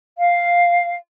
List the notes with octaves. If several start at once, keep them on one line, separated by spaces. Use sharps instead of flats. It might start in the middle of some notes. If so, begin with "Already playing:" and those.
F5